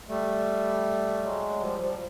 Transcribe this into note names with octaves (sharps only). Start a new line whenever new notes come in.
G3 A3
F#3 G#3
F3 G3
F3 G3